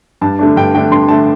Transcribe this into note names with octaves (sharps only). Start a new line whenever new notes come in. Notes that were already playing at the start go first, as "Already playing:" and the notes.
G2 A5
D3 A3 D4
G2 G5
D3 A3 D4 G5
G2 C6
D3 A3 D4 A5